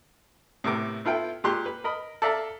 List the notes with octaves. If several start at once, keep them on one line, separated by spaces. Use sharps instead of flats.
A2 C3 B3 A#4 D6
B3 E4 F4 A4 G5
A#2 G#3 G4 C6 F#6
B4
A#4 D#5 B5
A4 D5 E5 F5 A#5